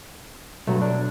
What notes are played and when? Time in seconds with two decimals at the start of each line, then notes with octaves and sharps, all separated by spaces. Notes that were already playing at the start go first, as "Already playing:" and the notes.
0.67 B1 G2 F#3 A3
0.81 D4